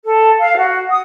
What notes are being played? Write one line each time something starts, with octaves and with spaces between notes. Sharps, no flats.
A4
F5
F#4
D#6